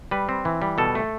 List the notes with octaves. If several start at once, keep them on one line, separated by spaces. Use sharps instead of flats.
G3 B4
C4
E3
G3
B2 A4
A3